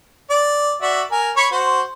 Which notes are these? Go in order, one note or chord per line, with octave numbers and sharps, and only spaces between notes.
D5
F#4 D5 E5
A#4 G#5
C#5 B5 C#6
F#4 C5